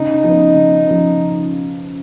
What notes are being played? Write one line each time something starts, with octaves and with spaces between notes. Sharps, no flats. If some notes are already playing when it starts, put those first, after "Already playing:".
Already playing: C#3 D#4
F3 B3
C#3
F3 B3